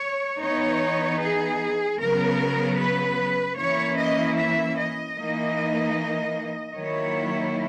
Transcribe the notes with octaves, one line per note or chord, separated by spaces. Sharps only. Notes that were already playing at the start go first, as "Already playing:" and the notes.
Already playing: C#5
E3 B3 D#4 C#5
G#4
C#3 F#3 B3 A#4
B4
E3 A#3 C#4 E4 C#5
D#5
E5
D#5
E3 A#3 D#4
D#3 F#3 A#3 E4 C#5